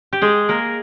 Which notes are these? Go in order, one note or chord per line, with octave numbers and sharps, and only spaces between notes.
G4
G#3 G#4
A#3 A#4